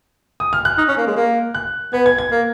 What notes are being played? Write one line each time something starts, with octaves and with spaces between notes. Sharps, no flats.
D#6
F6
F#6
D#4
C#4
A#3
G#3
A#3
F#6
B3 G#6
G#6
G#6
A#3